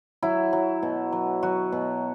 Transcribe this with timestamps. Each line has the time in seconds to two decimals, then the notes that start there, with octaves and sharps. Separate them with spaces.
0.23 F#3 E4
0.53 F#3
0.82 B2
1.12 F#3
1.43 F#3 F#4
1.72 B2